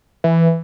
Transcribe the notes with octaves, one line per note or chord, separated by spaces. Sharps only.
E3